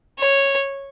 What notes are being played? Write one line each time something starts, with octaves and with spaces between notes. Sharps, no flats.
C#5